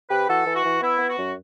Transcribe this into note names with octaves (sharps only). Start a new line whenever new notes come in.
C3 G4 B4
E3 F#4 A4
E3
F#4
E3
B3 E4
B3
F#4
F#2